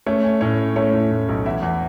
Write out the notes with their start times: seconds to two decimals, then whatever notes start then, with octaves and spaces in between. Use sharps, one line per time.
0.06 A3 C#4 C#5
0.24 C#4
0.41 A2 C#4 C#5
0.59 C#4
0.76 A3 C#4 C#5
0.93 A2
1.11 A2
1.29 B1
1.46 E2 E4 E5
1.63 E2